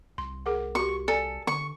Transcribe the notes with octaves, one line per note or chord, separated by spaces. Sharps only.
C2 C6
G#4 A#4 F#5
F#4 G4 C#6
A4 D5 G#5
D3 C#6